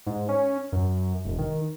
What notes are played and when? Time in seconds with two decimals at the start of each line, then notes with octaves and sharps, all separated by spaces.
0.06 G#2
0.29 C#4
0.72 F#2
1.25 E1
1.39 D#3